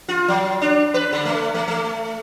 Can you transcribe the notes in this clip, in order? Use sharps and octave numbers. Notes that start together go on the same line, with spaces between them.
F4
F#3
D4
B4
D3
A3
A3
A3